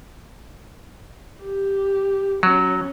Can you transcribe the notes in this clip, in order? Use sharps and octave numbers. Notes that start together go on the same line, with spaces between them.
G4
F#3 C#4